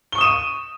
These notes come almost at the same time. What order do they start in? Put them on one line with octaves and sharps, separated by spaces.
G7 C#6 D#6 E7 D#7